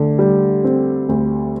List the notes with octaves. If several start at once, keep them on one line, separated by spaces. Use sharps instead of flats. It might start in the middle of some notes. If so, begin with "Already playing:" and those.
Already playing: D2 D3
G3
C4
D2